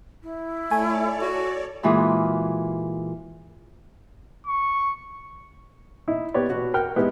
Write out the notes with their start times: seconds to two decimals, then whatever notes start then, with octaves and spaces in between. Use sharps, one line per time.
0.23 E4
0.71 A3 A4 C#5 D5 G#5
1.22 F#4
1.83 A#2 E3 G#3 F4 F#4 G#4
4.47 C#6
6.08 D#4 E4
6.34 B3 G4 C#5 D5
6.50 B2 F#4
6.74 A#4 F#5 G5 F6
6.96 G#3 B3 D#4 E4 G4